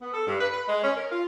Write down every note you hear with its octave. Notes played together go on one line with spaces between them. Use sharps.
B3
A4
G2
B4
B4
G#3
C#4
A#4
F4